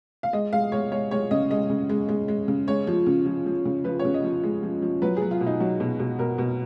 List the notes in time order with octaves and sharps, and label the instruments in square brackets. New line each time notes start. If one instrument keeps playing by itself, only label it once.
[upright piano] F5
G#3 D#5
G#3 F5
G#3 C#5
G#3 C#5
G#3 C#5
C#3 D#5
G#3 D#5
C#3
G#3
G#3
G#3
C#3
G#3 C#5
F3
C#3
F3
F3
C#3
F3 B4
C#5
C#3
D#5
F3
G#3
F3
F3
F#3 B4
G#4
F#3
F4
B2
D#4
F#3 F#4
B2
B2
B2 A#4
B2